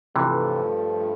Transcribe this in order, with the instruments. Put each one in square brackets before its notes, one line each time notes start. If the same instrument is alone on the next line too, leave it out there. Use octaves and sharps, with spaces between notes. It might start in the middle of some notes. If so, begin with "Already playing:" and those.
[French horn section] G2 F3 A3 [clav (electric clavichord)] C3 E3